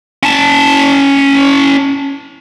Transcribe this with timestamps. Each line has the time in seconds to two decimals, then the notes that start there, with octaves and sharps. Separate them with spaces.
0.23 C#4 A5